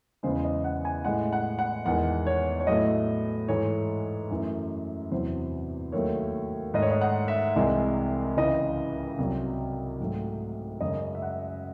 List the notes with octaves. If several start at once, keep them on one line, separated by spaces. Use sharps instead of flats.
E2 C#3 G#3 C5
D#5
F#5
G#5
A2 G#3 F#5
F#5
F#5
E2 D#3 G#3 F#5
C#5
C#5
A2 F#3 A3 D#5
G#2 E3 A3 C#5
F#2 E3 A3
E2 C3 F#3 C5
D#2 D#3 F#3 A3 C#5
G#2 D#3 A3 D#5
C#5
D#5
F#5
E5
C2 C3 E3 G#3
C#2 C#3 E3 D#5
C2 C3 F#3
G#2 F#3 A3
F#2 C#3 G#3 D#5
E5
F#5